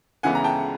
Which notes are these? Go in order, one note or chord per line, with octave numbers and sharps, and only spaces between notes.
D2 C#3 E3 G#3 B3 F#5 G#5
A#5
G5 A5